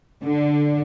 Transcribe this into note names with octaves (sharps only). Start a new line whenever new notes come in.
D3